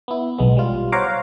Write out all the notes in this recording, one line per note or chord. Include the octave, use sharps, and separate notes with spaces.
B3 E4
B1 G#3 B3
G3 F4
C5 C#5 F5 F#5 A#5 D6